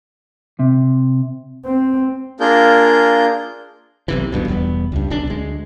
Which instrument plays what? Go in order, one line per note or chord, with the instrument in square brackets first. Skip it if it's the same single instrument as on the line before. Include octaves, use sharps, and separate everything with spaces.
[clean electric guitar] C3
[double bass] C4
[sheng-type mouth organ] A#3 D4 F4 G#4 A#4 G6
[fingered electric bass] B1 C3 E3
D1 A1 G2 B2
E1 E2 G3 B3
C#2 G2
D1 B1 C#4 D4
D2 G#3